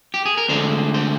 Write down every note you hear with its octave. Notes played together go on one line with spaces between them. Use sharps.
G4
G#4
A#4
D2 D3 G#3 C5
C5